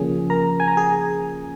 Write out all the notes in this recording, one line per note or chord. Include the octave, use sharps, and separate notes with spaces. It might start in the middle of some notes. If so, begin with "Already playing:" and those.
Already playing: C#3 F3 A#3 C#4 G#4
A#4 A#5
G#5
A#5
G#4 G#5